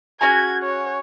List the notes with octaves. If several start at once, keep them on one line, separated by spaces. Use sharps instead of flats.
C#4 F#4 G#4 G#6
C#5